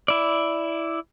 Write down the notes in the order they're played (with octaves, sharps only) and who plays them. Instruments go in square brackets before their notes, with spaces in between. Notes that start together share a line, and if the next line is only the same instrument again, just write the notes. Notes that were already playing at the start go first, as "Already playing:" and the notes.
[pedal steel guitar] E4 D5